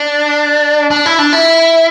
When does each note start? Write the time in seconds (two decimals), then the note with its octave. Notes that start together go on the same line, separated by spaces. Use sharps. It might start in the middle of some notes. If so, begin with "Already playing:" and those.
Already playing: D4
0.91 D4
1.06 E4
1.19 D4
1.33 E4